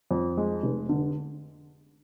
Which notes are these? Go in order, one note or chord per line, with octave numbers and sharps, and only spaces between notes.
F2
G#3
F1
D3